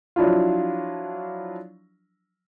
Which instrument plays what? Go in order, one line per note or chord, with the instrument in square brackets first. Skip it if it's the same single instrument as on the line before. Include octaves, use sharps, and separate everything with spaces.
[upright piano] F3 F#3 D4 E4 F4